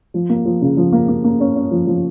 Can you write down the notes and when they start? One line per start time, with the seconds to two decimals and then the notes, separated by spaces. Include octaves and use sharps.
0.14 F3
0.29 A#3
0.45 F3
0.61 C#3
0.77 F3
0.92 A#3
1.08 A#3
1.24 A#3
1.41 C#4
1.56 C#4
1.71 F3
1.87 F3